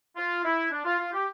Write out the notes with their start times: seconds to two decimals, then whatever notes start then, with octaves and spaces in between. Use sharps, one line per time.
0.17 F4
0.45 E4
0.72 D4
0.85 F4
0.99 F4
1.13 G4